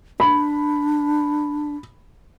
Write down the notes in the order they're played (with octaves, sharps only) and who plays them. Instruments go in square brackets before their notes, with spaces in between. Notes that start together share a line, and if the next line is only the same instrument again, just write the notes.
[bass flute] D4 [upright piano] B5